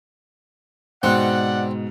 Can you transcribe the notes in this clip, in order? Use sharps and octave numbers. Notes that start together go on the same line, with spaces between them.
G#2 B2 C4 D5 F#5